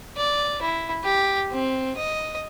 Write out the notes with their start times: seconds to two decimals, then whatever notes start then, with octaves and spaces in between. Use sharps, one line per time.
0.17 D5
0.62 E4
1.04 G4
1.52 C4
1.97 D#5